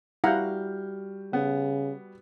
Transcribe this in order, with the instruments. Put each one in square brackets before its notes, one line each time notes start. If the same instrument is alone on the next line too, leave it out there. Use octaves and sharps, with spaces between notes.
[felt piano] G3 F#4 G6 [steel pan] E4 F#5 A#5 [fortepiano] F5
[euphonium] C#3 [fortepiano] B3